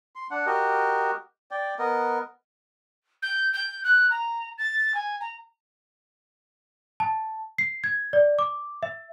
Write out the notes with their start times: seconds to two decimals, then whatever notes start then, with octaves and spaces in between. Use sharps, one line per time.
0.16 C6
0.31 D4 F#5
0.46 F#4 G4 A#4 D#5
1.51 D5 G5
1.79 B3 A#4 D#5
3.22 G6
3.53 G6
3.84 F#6
4.11 A#5
4.58 A6
4.94 G#5
5.21 A#5
7.00 A5
7.58 C7
7.84 G#6
8.13 D5
8.39 D6
8.83 E5